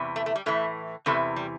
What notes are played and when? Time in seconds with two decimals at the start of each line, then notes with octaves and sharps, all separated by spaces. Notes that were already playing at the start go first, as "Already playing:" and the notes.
Already playing: E2 C3 E3
0.16 A3
0.26 A3
0.36 G3
0.46 A2 E3 A3
1.06 E2 C3 E3 A3
1.36 G3